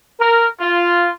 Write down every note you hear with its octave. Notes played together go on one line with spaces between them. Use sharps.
A#4
F4